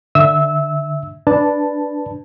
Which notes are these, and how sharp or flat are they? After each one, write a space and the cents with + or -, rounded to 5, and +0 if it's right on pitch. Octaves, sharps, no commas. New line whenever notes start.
D3 +10 E5 +0 E6 -20
D4 +0 B4 +0 A5 +0